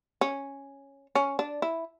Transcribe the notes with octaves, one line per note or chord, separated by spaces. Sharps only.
C#4
C#4
D4
E4